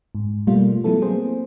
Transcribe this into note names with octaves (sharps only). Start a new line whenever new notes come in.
G#2
B2 G3 A3 A#3 F4
F#3 A3 B3 E4 A4
A#3 C4 G#4 C5